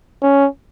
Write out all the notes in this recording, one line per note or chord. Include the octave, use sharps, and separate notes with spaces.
C#4